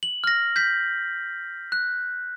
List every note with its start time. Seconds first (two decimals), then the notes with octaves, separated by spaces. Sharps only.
0.03 F#7
0.24 F6 A#6
0.56 G6 B6
1.72 F#6